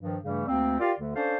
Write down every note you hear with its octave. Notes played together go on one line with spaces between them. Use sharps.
G2 D#3 F3
G2 C#3 E3 G3 A3
D2 A#3 C4
F4 G4 A#4 D5 F5
D2 D3
C#4 D4 A4 C5 F5